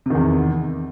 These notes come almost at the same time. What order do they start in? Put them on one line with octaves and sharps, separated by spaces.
C3 D#3 E2